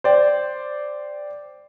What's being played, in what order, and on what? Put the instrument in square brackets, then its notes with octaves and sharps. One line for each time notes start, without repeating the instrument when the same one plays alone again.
[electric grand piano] C5 D5 G5